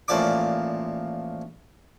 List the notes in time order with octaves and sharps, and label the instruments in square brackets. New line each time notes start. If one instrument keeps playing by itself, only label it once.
[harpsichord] A1 A#2 F3 D5 D6